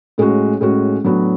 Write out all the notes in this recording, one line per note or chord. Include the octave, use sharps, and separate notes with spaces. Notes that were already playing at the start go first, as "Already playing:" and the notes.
A2 G#3 C#4 F#4
A2 G#3 C#4 F#4
A2 F#3 B3 D4 F#4